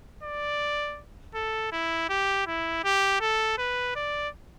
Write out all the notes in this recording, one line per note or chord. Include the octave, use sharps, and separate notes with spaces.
D5
A4
E4
G4
E4
G4
A4
B4
D5